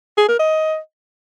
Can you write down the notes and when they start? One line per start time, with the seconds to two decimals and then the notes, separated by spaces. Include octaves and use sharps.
0.17 G#4
0.28 A#4
0.39 D#5